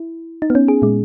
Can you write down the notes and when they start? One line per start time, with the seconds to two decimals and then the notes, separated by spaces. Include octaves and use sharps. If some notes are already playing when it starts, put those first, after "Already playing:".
Already playing: E4
0.42 D#4
0.50 B3
0.55 C#4
0.68 G#4
0.82 A#2 G#3